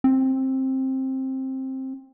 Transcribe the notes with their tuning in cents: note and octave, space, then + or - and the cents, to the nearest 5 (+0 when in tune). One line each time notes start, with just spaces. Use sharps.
C4 +15